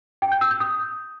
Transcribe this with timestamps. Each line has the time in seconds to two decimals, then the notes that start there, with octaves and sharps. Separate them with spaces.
0.22 G5
0.32 G6
0.41 E6
0.51 G6
0.60 D#6